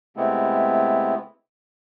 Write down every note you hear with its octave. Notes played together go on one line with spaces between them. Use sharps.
C3 G#3 A3 B3 C4 E4